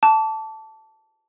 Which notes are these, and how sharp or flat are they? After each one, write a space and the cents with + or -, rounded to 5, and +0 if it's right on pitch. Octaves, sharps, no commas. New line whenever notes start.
A5 +0 D6 -35